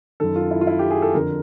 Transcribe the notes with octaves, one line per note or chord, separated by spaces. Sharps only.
F#2 D#3 A4
F4
E4
F4
E4
G4
G#4
A4
F2 D3 A#4